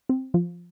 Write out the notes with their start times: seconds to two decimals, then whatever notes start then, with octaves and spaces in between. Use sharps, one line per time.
0.09 C4
0.34 F3